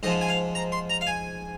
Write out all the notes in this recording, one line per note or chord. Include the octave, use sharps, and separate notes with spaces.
G#2 F3 G#3 D#5
G#5
F5
A#5
C6
A#5
F5
G#5